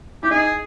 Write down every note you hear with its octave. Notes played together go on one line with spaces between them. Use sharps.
E4 G4
D#4 G#4